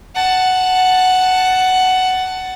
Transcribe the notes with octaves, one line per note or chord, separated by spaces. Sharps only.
F#5 A5